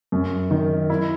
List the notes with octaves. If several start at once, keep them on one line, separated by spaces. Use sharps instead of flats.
F#2
D#3
E4